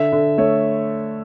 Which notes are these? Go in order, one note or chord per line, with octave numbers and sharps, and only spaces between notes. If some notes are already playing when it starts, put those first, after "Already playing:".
Already playing: D3 E5
D3
A3 C#5